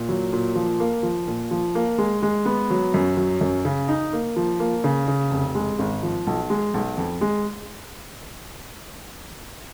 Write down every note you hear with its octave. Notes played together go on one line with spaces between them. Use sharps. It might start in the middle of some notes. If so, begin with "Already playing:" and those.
Already playing: A#2
F#3
A#2
F3
A#3
F3
A#2
F3
A#3
G#3
G#3
B3
F#3
F#2
F#3
F#2
C#3
D#4
A#3
F3
A#3
C#3
C#3
F1
G#3
G#1
F3
B1
G#3
B1
F2
G#3